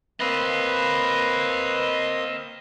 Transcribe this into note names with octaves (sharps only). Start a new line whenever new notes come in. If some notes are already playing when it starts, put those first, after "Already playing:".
A#3 C4 B4 D#5 F5 D#6